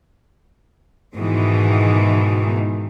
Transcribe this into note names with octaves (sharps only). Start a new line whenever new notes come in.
G#2 B2 D#3 E3 G#3